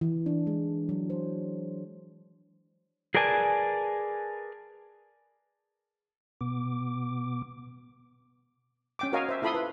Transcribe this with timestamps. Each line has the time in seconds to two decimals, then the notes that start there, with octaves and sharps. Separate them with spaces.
0.01 E3
0.26 D4
0.47 G#3
0.89 F#3
1.10 C5
3.15 G#4 A#4 B4 D5 G#5 A5
6.41 B2 B3 D6
8.99 C#4 G5 D6
9.12 F#4 A#4 C#5 D#5 F5 G#5
9.29 C5 E5
9.42 E4 F4 A4 B5 C6 D#6
9.55 B4